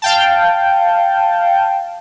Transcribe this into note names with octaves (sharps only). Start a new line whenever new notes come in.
F5 G5 A5